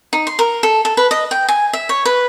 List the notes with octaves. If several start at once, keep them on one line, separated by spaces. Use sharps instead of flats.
D#4
C6
A#4
A4
A4
B4
D#5
G5
G#5
E5
C#5
B4